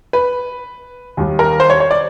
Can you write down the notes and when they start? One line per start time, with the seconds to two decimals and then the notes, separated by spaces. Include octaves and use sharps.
0.13 B4
1.17 D#2 D#3 G3
1.39 A#4
1.60 C5
1.70 C#5
1.80 C#5
1.91 D5